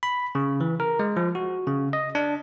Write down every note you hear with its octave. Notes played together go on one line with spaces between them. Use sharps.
B5
C#3
E3
A#4
G#3
F3
F#4
C#3
D#5
D4